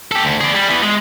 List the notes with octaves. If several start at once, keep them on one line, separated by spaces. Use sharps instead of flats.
G4 A4
D2
G#4 D5
G3
E3 B3
G#3